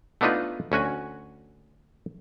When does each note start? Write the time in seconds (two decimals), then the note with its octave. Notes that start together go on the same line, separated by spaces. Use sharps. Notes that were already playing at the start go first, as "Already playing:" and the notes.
0.21 A3 B3 D4 D#4 F4 B4
0.72 D2 C#4 F#4 G#5